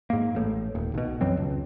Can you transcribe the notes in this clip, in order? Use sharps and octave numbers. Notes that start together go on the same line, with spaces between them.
G#2 A#3
A1 A2
D#1
B1 B2
F#2 E3 F#3 C4
C#2